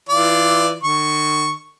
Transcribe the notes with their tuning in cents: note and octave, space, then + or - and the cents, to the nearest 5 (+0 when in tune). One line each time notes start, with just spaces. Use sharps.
E3 +0 F4 -20 D5 +0
D#3 -45 C#6 +0